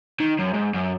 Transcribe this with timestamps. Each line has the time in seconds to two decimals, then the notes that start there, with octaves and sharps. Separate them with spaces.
0.20 D#3
0.39 F#2
0.53 G#2
0.74 F#2